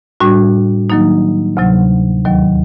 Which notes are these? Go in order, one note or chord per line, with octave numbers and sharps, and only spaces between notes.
A2 G3 D4 F#4
D#3 F#3 A#3 D#4
D2 C3 F#3
D#2 D#3 F#3